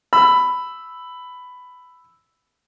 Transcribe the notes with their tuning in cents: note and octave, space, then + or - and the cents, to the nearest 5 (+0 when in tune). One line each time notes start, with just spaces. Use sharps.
B5 +10 E6 +0